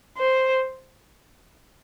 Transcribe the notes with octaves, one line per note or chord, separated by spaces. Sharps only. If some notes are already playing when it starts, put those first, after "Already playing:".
C5